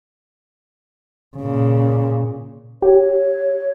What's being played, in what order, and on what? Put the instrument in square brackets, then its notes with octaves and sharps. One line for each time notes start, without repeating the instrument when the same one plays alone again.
[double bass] A#2 C#3
[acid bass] G4 [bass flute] C#5